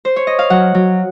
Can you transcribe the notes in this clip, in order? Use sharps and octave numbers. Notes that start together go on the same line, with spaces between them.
C5
C#5
D#5
F5
F#3 F#5
F#3